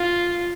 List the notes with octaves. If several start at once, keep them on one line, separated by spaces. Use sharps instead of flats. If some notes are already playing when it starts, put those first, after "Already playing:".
Already playing: F4